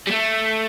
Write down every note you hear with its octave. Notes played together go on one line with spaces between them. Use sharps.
G3
A3